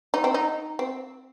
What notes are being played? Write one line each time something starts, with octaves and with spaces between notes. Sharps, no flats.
D#4
C4
D#4
C4